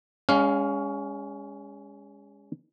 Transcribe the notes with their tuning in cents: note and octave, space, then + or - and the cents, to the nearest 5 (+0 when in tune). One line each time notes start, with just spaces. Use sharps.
G#3 -30 C#4 +20 F5 +0